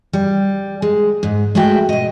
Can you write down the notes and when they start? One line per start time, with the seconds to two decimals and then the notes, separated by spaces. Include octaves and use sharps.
0.13 G3
0.82 G#3
1.23 G#2
1.55 G#3 A3 F#4 E5 G5
1.89 B2 D#5